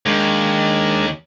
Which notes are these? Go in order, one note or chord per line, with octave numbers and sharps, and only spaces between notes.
D#2 G#3 D4 A#4